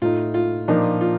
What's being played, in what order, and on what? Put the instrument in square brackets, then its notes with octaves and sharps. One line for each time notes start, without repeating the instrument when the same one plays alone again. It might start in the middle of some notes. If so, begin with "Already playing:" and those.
[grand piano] A2 A3 D#4 [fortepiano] F4
[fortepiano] F4
[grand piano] A#2 F3 A#3 D4 [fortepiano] D#4
[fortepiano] F4